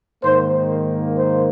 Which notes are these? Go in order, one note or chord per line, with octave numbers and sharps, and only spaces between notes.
G#2 D#3 A#3 C5
C5